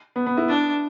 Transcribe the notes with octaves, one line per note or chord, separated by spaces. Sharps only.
B3
B3
E4
D4